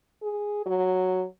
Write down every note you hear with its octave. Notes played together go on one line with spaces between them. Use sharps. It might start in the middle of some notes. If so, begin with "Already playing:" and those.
G#4
F#3